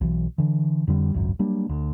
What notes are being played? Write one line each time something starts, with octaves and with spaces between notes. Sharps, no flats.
B1 E3
D3 E3
F2 D3 G3
G#1 C#2 F#2
F#3 G3 A#3 D4
D2